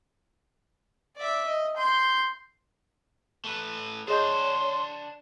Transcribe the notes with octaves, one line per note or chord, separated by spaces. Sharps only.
D5 E5
D#5
C6 G6
A3 B4
D4 G#4 C5 C#5 D#5 C6 G6